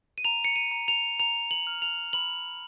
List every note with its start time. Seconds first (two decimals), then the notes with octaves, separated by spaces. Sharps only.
0.18 D#7
0.25 A#5 F7
0.45 C#7
0.56 D#7
0.71 A#5
0.88 F7
1.20 A#5 F7
1.51 F#7
1.67 F6
1.82 F7
2.13 B5 F#7